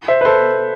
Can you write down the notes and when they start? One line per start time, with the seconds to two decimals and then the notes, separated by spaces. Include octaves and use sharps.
0.08 C5 E5
0.21 B4
0.25 A4 C5